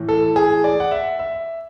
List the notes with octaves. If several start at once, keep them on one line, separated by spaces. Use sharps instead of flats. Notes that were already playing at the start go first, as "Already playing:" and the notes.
Already playing: A2 E3
A4
G#4
D5
F#5
E5
E5